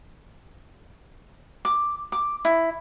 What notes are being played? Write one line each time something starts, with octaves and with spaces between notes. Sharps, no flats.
D6
D6
E4